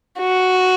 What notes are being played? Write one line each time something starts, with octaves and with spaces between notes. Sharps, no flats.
F#4